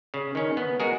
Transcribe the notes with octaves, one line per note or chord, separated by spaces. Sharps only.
C#3
D#3 C#4
B3
G#3 F#4 G#4 A#4